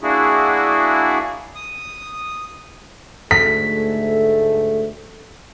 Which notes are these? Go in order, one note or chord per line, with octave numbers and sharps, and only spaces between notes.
A#3 D4 E4 F#4 G#4
D#6
D2 G#2 A3 B6